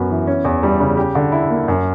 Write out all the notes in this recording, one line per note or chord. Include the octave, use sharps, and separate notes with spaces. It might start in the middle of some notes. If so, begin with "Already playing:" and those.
Already playing: F#2 B3 F#4
E3
C#4
E2
G3
C#3
G4
D3
E4
A#3
F#2